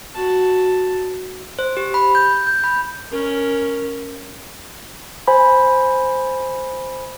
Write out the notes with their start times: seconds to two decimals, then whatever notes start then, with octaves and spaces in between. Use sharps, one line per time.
0.16 F#4 A5
1.59 C5
1.77 G4
1.94 B5
2.15 G6
2.47 G6
2.64 B5
3.11 C#4 A#4
5.28 C5 G#5 B5